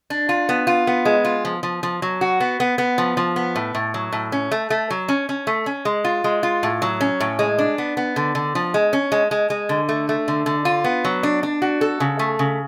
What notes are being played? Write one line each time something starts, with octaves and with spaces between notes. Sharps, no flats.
D4
F4
B3
F4
B3
G#3
F4
F3
F3
F3
F#3
F#4
B3
B3
B3
F3
F3
B3
A2
A2
F#3
A2
C#4
A3
A3
F#3
C#4
C#4
A3
C#4
G#3
F4
G#3
F4
A2
F#3
C#4
A2
G#3
D4
B3
B3
D3
D3
F3
G#3
C#4
G#3
G#3
G#3
D3
A3
A3
D3
D3
F4
B3
F#3
D4
D4
F#4
A4
C#3
A3
C#3